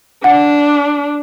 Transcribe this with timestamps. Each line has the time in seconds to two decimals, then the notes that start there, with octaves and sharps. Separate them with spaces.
0.24 D4 F#5